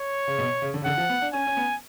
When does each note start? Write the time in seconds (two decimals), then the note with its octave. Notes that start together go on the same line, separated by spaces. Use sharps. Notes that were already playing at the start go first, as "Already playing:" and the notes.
Already playing: C#5
0.28 C#3
0.39 B2
0.62 C#3
0.74 D3
0.82 C#3
0.85 D3 F#5
0.98 F3
1.09 B3
1.22 D4
1.33 C#4 G#5
1.47 C#4
1.57 B3